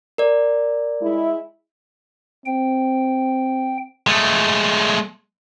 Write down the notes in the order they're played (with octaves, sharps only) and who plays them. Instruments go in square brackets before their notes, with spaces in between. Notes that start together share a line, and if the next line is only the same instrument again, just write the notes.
[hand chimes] A#4 D5
[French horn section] G#3 E4
[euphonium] C4 [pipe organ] G5
[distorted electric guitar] G#3 A3